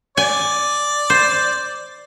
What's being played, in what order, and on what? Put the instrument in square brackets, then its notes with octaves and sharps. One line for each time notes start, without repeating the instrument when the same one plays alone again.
[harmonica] D5 [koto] G#5
[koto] C5